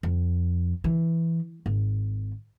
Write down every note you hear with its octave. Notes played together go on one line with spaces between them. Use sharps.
F2
E3
G#1